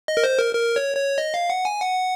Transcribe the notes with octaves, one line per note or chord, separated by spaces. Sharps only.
D#5
A#4
C5
A#4
A#4
C#5
C#5
D#5
F5
F#5
G#5
F#5